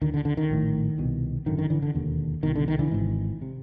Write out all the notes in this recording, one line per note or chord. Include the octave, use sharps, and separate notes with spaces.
D2 D3 D#3
D3
D3
D#3
A#1 A2
C2 B2
G#1 F#2 D3 D#3
D#3
D3 E3
D3
E1 D#2 D3
C2 B2 D#3
D3
D#3
D3 E3
G#1 G#2
C3